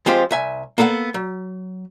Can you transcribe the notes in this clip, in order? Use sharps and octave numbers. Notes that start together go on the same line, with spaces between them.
F3 G#3 C4 F4 G4 C5
C2 E5 G#5
A#3 B3 A4 F5 F#5
F#3